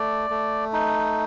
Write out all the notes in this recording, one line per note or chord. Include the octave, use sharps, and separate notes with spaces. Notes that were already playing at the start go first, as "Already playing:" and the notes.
Already playing: A3 D5
A3
D#4